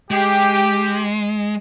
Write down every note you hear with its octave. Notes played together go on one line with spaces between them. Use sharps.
G#3 G4